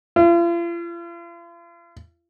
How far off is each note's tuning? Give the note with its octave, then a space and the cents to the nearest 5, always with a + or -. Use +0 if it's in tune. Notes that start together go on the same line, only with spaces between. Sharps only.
F4 -40